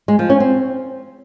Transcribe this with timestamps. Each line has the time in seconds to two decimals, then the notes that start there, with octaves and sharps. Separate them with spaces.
0.08 G#3
0.19 F3
0.30 C#4
0.40 C4